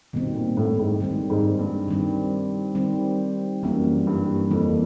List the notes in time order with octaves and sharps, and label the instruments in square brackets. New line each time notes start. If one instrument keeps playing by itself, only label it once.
[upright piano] B2 [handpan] D#3 G3 C4
[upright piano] A#2
A2
G#2
[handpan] D#3 G3 C4
[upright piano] G#2
G2
[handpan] D#3 G3 C4
D#3 G3 C4
[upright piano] F#2 [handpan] E3 G3 A#3
[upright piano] G2
[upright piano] F2 [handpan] E3 G3 A#3